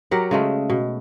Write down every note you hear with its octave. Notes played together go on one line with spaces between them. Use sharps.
F#3 G4 A#4 F#5
C#3 G#3 A3
B2